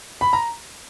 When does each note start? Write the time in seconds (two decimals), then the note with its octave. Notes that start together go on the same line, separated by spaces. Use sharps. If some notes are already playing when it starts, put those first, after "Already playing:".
0.21 B5
0.33 A#5